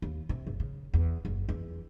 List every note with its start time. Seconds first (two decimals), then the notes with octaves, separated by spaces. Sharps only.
0.02 D#2
0.29 C3
0.47 F#1
0.60 C#3
0.94 E2
1.25 F#1
1.49 E2